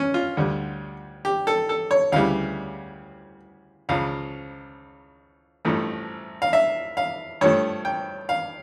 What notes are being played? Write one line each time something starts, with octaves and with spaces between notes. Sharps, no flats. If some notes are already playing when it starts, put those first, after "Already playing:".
Already playing: C#4
F4
D2 D3 G3
G4
A4
A4
C#5
D2 C#3 E3 G3 F5
C#2 C#3 F3 F5
A1 G2 F3 A3
F5
E5
F5
G2 F3 A3 C#5
G5
F5